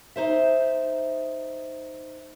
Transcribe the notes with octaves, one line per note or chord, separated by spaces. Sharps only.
D#4 C5 E5